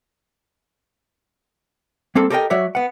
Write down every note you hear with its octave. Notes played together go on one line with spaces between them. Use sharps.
G3 A#3 C4 A4
G4 A4 A#4 C5 D#5 G5
F#3 F#4 C#5 D5 E5
B3 F#5